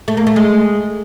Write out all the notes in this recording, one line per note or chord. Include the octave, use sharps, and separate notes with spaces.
A3
A#3
A3
G#3